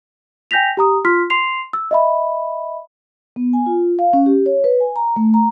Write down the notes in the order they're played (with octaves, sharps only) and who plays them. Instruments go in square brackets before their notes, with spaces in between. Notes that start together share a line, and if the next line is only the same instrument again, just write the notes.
[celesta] G5 G#5 G6 A#6 B6 F7
G4 A#5 D#6
F4 C6 F6 B6
C6 C7 F7
E6
D#5 E5 B5
[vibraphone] B3
G#5
F4
F5
C#4
G4
C#5
B4
G#5
A#5
A3
A#5